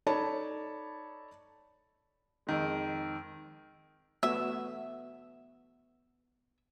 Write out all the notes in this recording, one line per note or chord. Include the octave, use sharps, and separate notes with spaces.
D#4 A4 C#5 D5 A5 B5
F2 D#3 G#3
A3 B3 F#4 E5